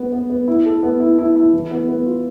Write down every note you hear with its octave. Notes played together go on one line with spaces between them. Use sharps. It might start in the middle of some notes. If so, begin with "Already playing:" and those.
Already playing: B3 B4
B3
B3
E4
A4
B3
E4
E4
E4
E3
B3
B3
F4